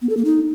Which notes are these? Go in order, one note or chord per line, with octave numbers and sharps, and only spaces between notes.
B3
A4
A#3
D#4